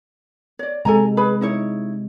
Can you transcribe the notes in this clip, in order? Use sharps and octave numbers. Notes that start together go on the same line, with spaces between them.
C#5 D5
C3 G#3 C4 A4 G#5 A#5
G#4 B4 B5
D#4 E4 C#5